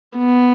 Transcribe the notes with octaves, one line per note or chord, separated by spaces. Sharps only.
B3